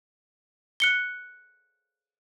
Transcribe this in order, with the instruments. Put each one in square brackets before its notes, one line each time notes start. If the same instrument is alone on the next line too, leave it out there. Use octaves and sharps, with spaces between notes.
[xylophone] F#6 C#7 G7